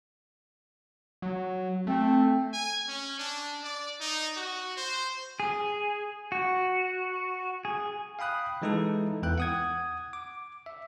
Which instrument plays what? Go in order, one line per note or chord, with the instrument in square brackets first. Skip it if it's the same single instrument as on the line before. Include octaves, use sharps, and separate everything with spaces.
[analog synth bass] F#3
[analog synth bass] A3 [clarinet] C4
[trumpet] G#5
C#4
D4
D5
D#4
F#4
C5
[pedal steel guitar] G#4
F#4
G#4
[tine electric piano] F5 G5 B5 D#6 F#6
E3 G#3 D#4 E4 A4
E2 E3 G5 F#6
F#5 D#6 G#6
D6
E5